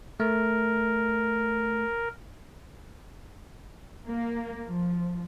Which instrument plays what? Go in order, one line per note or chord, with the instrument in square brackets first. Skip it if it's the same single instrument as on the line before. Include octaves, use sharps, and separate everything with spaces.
[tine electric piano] A3 [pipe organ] A#4
[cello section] A#3
F3